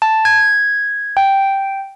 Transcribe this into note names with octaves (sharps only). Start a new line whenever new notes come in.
A5
G#6
G5